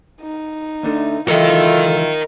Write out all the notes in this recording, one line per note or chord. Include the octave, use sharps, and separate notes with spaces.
D#4
D2 D3 A3
C#2 E3 F#3 F4 A4 A#4 D#5 E5